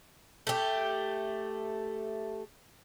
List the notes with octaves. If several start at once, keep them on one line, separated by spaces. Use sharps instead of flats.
A3 G4